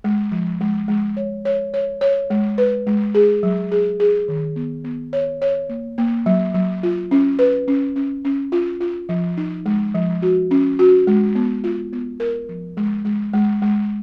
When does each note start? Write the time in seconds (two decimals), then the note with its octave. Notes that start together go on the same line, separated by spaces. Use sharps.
0.04 G#3
0.32 F3
0.61 G#3
0.88 G#3
1.17 C#5
1.45 C#5
1.74 C#5
2.01 C#5
2.30 G#3
2.58 B4
2.87 G#3
3.15 G#4
3.43 F#3
3.72 G#4
4.00 G#4
4.28 D#3
4.56 B3
4.84 B3
5.13 C#5
5.42 C#5
5.69 A#3
5.98 A#3
6.26 F#3
6.54 F#3
6.83 F4
7.11 C#4
7.39 B4
7.68 C#4
7.96 C#4
8.25 C#4
8.52 F4
8.81 F4
9.09 F3
9.37 D#4
9.66 G#3
9.95 F3
10.22 F#4
10.51 C#4
10.79 F#4
11.07 G#3
11.35 B3
11.64 F4
11.93 B3
12.20 A#4
12.49 F3
12.77 G#3
13.05 G#3
13.33 G#3
13.62 G#3